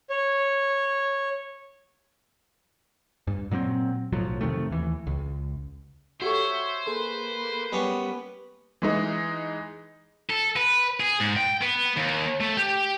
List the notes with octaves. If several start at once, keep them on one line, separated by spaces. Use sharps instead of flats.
C#5
G2
A#2 F#3 A#3 C4
B1 A2 F3 F#3
F2 C3 D#3 A3
D#2 E3
C#2
F#4 G4 A4 C5 C#5 E5
A#3 G#4 A4 B4 C6
G3 B3 C#4
E3 G#3 D#4
A4
B4
G#4
G#2
G5
B3
D#2
A3
G4